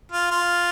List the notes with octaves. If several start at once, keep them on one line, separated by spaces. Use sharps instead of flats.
F4
F4